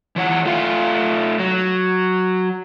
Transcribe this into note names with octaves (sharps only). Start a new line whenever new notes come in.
E3 C#5 F#5
A3 F4 F5
F#3